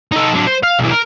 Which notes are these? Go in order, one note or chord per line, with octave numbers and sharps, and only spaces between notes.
D#4 A4
F#3 D4
C5
F5
B1 E3
A#4